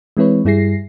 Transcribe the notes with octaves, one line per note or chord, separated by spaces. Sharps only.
E3 G#3 C4 E4 B4 C#5
G2 G3 E4 G#4 A#6 C7